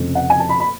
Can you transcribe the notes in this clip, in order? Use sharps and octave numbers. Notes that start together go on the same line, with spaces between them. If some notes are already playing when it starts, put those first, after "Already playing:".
Already playing: F1 F2 C#3 F3
F#5
G#5
A5
B5
B5